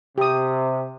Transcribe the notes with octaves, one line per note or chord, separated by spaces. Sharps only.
C3 G4 D#6